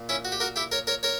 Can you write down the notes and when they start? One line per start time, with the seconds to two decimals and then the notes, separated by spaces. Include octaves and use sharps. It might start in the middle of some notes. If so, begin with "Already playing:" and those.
Already playing: A#2
0.09 C#4 E4
0.25 F#4
0.32 G4
0.40 F#4 A#4
0.56 E4 G4
0.72 A#4 C#5
0.87 A#4 C#5
1.03 A#4 C#5